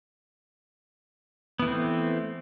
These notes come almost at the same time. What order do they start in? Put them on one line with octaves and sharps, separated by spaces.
B3 E3 A3 C4